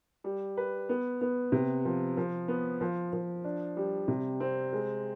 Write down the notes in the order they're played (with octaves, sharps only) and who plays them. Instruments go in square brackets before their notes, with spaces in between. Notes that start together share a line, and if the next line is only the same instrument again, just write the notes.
[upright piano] G3
B4
B3
B3
C3
F3
F3
B3
F3
F3
D4
G3
C3
C4
G#3